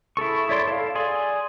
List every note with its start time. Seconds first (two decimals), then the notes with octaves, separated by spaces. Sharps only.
0.17 E4 G#4 A4 C#6
0.49 E4 C#5 D5 C6
0.68 A4 F5
0.95 G#4 D5 C6